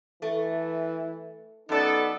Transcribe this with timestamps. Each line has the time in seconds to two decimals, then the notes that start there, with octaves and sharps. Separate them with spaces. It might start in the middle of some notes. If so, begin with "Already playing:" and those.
0.22 E3 A3
1.69 F#2 B3 D#4 A4 D5